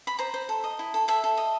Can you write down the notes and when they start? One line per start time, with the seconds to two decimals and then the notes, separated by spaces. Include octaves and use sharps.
0.07 B5
0.19 C5 A#5
0.34 C5
0.49 A4
0.64 D#5
0.79 E4
0.94 A4
1.08 A4 E5
1.24 A4
1.37 D#5